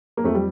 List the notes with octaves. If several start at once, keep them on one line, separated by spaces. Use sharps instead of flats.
A#3
F2 A3
G3